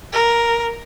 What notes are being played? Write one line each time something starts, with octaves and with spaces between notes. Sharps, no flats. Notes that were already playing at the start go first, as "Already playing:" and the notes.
A#4